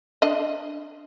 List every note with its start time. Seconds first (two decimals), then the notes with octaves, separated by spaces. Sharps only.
0.22 D4 D#5